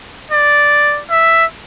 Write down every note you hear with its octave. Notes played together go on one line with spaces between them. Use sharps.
D5
E5